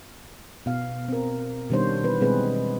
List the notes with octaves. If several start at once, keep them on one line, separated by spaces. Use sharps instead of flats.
B2 F5
C4 A#4
B2 D#3 G3 D4 C5 C#5
E3 B3 B4
B2 G3 G#3 C4 G#4 B4